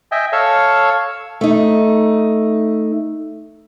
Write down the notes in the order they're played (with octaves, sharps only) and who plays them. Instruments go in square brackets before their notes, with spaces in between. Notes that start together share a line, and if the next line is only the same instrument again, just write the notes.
[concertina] D#5 E5 G5 G#5
A4 C#5 F5 C#6 E6
[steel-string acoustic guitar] A3 D#4